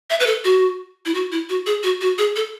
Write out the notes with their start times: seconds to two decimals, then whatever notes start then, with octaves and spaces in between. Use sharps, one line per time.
0.10 E5
0.20 B4
0.27 A4
0.44 F#4
1.06 E4
1.14 F#4
1.32 E4
1.49 F#4
1.66 G#4
1.83 F#4
2.01 F#4
2.18 G#4
2.36 A4